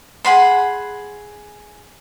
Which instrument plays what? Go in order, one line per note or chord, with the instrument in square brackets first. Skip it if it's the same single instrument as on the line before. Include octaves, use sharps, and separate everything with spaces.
[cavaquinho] G#4 F#5 B5 C6